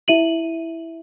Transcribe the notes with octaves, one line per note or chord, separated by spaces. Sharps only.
E4 E5 D#7 F#7